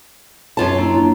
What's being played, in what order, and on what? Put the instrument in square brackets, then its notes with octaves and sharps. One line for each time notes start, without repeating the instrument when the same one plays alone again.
[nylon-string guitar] F#2 F4 A5
[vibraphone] A#3 D4 E4